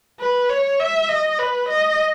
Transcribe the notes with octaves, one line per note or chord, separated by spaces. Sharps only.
B4
C#5
E5
D#5
B4
D#5